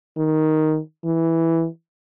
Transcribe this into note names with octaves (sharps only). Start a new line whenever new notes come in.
D#3
E3